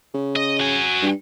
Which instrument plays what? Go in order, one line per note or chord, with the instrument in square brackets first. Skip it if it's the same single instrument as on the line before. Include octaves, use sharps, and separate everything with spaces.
[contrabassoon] C#3
[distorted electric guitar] D#5
F#4 G#5
[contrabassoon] G2